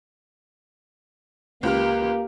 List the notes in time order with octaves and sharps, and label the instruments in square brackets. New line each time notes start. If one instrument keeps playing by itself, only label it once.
[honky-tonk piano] C#2 F6 [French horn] A#3 [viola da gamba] G4